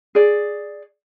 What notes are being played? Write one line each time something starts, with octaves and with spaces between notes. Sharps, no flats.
G#4 D5